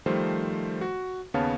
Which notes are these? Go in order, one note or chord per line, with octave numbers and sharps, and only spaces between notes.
D#3 F3 G3 A3 C5
F#4
D#2 C#3 B3 C#5 F5 A5